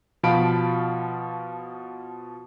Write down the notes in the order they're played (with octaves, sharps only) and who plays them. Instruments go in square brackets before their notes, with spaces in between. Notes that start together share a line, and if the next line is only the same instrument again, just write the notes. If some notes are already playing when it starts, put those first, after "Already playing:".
[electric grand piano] B2 F3 F5 A5 B5 D7